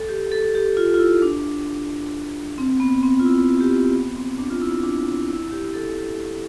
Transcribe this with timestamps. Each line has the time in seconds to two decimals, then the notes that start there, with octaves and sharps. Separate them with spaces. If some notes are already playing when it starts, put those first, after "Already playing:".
Already playing: A4
0.09 G4
0.32 A4
0.55 G4
0.77 F4
0.94 F4
0.99 E4
1.22 D4
2.58 C4
2.80 B3
3.03 C4
3.20 F4
3.25 E4
3.61 G4
3.71 F4
3.93 B3
4.16 C4
4.38 D4
4.50 F4
4.62 E4
4.84 D4
5.07 E4
5.29 E4
5.52 G4
5.74 A4